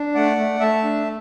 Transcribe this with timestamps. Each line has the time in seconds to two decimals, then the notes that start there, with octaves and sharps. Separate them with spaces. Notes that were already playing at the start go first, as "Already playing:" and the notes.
Already playing: D4
0.15 A3 D5 F#5
0.37 A3
0.60 A3 E5 A5
0.84 D4